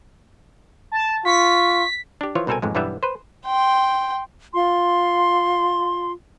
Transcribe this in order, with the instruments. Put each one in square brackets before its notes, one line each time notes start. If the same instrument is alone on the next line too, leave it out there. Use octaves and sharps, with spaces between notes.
[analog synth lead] A5
[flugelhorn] F4 [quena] C#6 [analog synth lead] B6
[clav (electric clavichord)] D4 G4
E3 F3 F4 C#5
C2 B2 C4 A4 A#4 G#5
A1 F2 G#2 G#3
B1 G2 E3 G3 B3 E5
B4 C5
[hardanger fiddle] G5 C6
[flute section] F4 C6